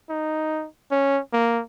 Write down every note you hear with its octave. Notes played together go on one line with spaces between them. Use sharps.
D#4
C#4
A#3